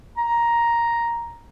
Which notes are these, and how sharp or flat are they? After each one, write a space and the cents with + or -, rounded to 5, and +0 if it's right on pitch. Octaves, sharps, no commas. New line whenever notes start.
A#5 +5